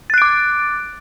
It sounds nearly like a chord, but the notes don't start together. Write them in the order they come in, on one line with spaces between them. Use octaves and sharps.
A6 F#6 D7 D6